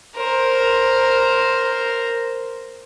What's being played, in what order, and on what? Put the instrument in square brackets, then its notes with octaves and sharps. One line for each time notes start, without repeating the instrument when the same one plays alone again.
[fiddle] A#4 C5